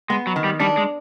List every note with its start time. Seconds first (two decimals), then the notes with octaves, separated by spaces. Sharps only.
0.10 G#3 B3
0.27 F#3
0.36 D#3
0.44 G3
0.60 G3 D4
0.77 G#3